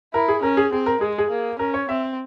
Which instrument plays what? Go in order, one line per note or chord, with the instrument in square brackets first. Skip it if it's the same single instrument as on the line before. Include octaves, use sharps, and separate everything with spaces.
[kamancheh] E4 [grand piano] A#4
[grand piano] G#4
[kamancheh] C#4 [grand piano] A#4
[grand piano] G#4
[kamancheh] C4 [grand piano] G#4
[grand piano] A#4
[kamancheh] G#3 [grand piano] G#4
[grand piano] G#4
[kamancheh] A#3
[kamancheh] C#4 [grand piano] A#4
[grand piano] C#5
[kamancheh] C4 [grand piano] E5